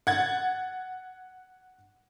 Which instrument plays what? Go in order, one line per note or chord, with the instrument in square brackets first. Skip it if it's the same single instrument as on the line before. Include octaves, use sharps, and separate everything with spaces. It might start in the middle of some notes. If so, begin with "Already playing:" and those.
[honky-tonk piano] F#5 G#6 A6